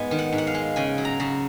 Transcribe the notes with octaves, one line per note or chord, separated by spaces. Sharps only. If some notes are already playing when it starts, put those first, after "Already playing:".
Already playing: G#2 G#3 B3 G#5
D#3
F#5
G#2
F#5
F5
G#3
C#3 G#5
F#3
A#5
C#3